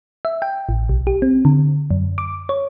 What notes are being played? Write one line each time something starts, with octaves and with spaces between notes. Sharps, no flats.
E5
G5
A1
B1
G4
C4
D3
F#2
D6
C#5